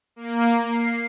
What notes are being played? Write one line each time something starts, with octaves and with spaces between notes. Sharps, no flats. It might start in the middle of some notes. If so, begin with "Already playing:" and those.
A#3
C7